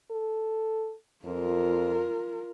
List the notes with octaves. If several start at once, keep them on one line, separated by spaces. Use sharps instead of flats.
A4
F2 F4 A#4